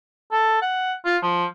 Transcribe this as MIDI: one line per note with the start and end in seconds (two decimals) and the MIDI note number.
0.32 0.62 69
0.62 0.95 78
1.05 1.17 65
1.23 1.45 53